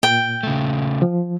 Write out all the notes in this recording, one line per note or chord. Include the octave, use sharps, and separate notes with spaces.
A#2 G5
C#3 A3
F3